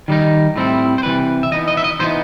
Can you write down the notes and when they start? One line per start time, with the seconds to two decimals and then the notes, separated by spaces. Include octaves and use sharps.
0.08 D#3 G3 D#4
0.56 A2 G3 C4 E4
0.98 C5
1.03 C3 E3 G3 B4
1.43 E5
1.51 E3 B3 D#4 D#5
1.68 D#5
1.77 E5
1.84 D#5
1.99 E3 B3 D#4 C5